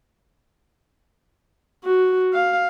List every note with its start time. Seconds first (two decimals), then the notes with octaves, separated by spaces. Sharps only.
1.84 F#4
2.33 F5